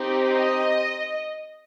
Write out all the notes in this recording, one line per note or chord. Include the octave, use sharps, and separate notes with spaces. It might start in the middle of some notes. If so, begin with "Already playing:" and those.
Already playing: C4 D#4 G4
D#5